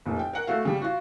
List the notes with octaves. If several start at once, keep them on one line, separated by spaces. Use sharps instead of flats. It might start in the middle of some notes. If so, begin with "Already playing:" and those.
F1 A#2
G5
A#4 F#5
A3 F#4 F5
C#3 G3
F4 F#4